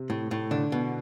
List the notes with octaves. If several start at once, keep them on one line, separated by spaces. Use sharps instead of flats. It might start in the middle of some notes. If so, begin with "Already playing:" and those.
Already playing: C3
A2
A2
D3 D4
B2